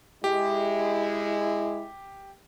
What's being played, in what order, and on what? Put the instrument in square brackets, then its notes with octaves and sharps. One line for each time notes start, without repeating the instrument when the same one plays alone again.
[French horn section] G#3 E4 [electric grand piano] G4